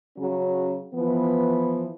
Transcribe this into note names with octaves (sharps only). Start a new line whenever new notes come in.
C#3 F#3 C#4
E3 F3 B3